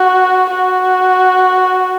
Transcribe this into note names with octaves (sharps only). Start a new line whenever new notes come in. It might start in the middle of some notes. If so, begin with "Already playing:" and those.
Already playing: F#4
F#4